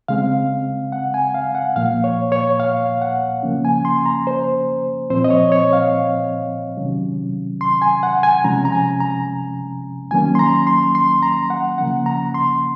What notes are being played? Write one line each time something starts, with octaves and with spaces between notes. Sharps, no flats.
C#3 G#3 C4 F5
F#5
G#5
F5
F#5
A#2 F3 A#3 F5
C#5
C#5
F5
F#5
C#3 F3 A#3 C#4
G#5
C6
A#5
C5
A#2 F3 C4 C5
D#5
C#5
C#5
F5
C3 D#3 F#3 C#4
C6
G#5
F#5
G#5
C3 F3 G#3 C#4 A#5
A#5
G#5
A#5
D#3 F#3 A#3 C#4 G#5
C6
A#5
C6
C6
A#5
F#5
C#3 F3 A#3 C#4 F#5
A#5
C6